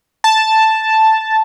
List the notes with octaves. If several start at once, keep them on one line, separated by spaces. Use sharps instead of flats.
A5